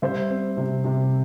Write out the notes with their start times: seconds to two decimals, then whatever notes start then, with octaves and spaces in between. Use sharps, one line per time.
0.02 G3 C5 E5
0.30 C4
0.57 C3
0.84 C3